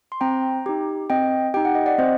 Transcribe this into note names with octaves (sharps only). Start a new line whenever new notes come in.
C6
C4 G5 A#5
D#4 G4
C4 D#5 G5
D#4 G4 G5
F#5
D#5
D5 F#5
C4 C5 D#5